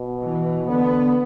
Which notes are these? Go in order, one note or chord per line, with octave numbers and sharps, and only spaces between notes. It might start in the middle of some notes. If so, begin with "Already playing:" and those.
Already playing: B2
E3
D3 B3